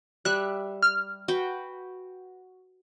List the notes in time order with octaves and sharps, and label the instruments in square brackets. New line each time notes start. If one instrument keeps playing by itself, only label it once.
[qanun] G3 E5 [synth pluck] F#6
[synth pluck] F6
[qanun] F#4 B4 G5